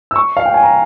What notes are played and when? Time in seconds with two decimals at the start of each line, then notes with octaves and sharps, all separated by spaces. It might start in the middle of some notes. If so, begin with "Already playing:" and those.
0.11 E6
0.16 C#6
0.37 F5
0.46 G5
0.54 G#5
0.63 A#5